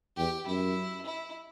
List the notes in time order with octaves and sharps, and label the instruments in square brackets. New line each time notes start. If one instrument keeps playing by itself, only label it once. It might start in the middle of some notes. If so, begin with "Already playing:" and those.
[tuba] E2 [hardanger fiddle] G4
[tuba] F#2 [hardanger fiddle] E4
[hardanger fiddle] E4